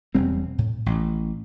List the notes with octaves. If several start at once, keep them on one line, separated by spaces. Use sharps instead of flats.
E1 G3 C4
A2
A1